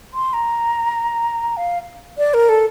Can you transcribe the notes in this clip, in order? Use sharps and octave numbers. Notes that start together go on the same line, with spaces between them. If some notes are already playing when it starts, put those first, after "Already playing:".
C6
A#5
F5
D5
A#4
A4